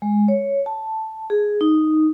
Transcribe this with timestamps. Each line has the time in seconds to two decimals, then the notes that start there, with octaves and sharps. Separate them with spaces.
0.02 G#3
0.28 C#5
0.66 A5
1.30 G#4
1.61 D#4